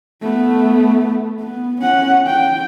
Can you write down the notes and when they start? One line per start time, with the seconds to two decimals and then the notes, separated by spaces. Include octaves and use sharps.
0.22 A3 B3
1.40 B3
1.81 C#4 F#5
2.26 G5